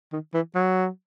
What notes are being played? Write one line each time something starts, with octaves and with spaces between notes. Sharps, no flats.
D#3
E3
F#3